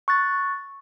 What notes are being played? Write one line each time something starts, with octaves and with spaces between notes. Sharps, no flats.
C#6 F#6 A6